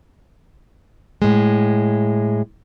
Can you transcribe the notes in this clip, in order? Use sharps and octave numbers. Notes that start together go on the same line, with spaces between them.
A2 G#3